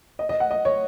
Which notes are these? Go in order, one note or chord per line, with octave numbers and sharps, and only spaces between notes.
D#5
D#5
F#5
D#5
C#5